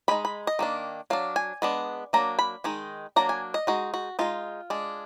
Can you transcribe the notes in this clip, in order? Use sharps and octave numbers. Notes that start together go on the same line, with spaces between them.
D#3 G#3 D#4 B5
B5
D#5
D#3 A#3 D4
F#3 D4 F5
G#5
G#3 B3 D4
F#3 A#3 D4 A#5
B5
D#3 G#3 D#4
F#3 A#3 D4 A#5
G#5
D#5
G#3 D#4 F#4
F#4
G#3 D#4 F4
G#3 D4